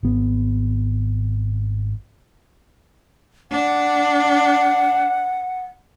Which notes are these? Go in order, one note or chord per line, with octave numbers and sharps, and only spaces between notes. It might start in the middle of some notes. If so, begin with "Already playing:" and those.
G#1 B3
D4 F#5